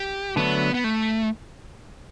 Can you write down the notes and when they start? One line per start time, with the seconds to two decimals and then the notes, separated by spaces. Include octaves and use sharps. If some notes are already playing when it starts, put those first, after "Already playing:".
Already playing: G4
0.36 D3 F#3 A3 B3 D4
0.74 B3
0.84 A3